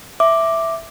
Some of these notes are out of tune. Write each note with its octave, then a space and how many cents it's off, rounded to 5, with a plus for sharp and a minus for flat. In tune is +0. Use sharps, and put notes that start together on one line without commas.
E5 +0 D6 +0